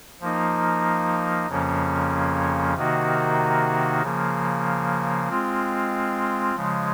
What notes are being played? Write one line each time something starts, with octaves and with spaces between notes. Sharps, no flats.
F3 A#3 D#4
F2 C#3 F3 A#3 C#4
C3 D#3 A#3 D#4 F#4
C#3 F3 A#3
G#3 C4 F4
C#3 F3 G#3